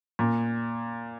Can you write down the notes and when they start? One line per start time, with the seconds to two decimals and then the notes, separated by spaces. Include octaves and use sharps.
0.19 A#2